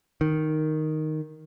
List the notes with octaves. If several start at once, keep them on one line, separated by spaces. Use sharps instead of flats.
D#3